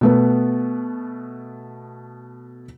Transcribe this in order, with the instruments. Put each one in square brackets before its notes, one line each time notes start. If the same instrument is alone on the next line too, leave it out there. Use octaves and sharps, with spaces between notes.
[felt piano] B2 A3 B3